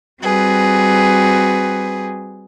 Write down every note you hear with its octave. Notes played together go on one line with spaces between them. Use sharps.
G3 C4 F#4 G#4 B4